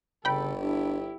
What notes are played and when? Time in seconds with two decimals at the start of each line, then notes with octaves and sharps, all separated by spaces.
0.25 G1 C#3 A4 G5 B5
0.60 D4 E4 G4